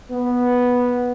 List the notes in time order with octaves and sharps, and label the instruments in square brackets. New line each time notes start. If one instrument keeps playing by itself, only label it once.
[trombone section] B3